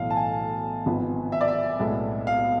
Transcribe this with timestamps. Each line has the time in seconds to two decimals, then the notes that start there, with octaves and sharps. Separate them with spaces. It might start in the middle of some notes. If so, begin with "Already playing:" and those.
Already playing: B1 A2 E3 A3 F5
0.10 A5
0.17 G#5
0.86 G#1 G#2 F3 B3 F4
1.32 E5
1.41 D5
1.48 E5
1.79 B1 A2 G#3 B3
2.27 F5